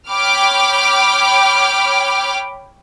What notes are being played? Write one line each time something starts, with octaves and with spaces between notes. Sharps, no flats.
C#5 G5 B5 D6 F6